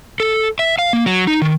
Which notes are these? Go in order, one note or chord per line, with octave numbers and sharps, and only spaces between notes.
A4
E5
F5
A#3
F#3
D#4
D#3